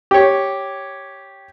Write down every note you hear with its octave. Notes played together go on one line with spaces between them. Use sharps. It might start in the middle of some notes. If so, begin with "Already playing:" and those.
G4 C#5